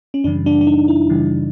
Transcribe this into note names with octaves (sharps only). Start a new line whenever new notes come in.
C#4
F#2 C#3 E3 G3 D4
D4
D4
D#4
E4
F#2 C#3 E3 G3